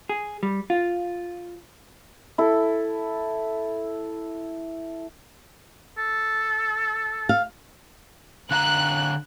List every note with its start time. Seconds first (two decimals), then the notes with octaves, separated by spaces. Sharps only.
0.09 G#4
0.43 G3
0.70 F4
2.38 E4 A4
5.97 A4
7.29 F5
8.51 D3 F5 A#5 F#6